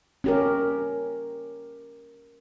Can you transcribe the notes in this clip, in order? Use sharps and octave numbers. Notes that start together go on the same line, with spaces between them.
C#4 G4 A#4